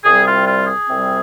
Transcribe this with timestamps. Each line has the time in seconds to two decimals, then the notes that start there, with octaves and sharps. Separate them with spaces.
0.04 C2 C3 G3 C4 G#4
0.26 F4
0.46 F4
0.67 G#4
0.87 C2 C3 G3 C4